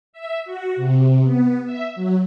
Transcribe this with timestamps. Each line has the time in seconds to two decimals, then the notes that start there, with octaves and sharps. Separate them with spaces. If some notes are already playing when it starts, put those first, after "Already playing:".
0.13 E5
0.45 F#4
0.76 C3
1.23 B3
1.65 E5
1.96 F#3